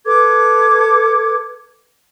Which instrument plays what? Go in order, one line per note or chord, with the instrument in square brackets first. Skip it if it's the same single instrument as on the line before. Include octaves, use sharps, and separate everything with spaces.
[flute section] A4 B4 D6 G#6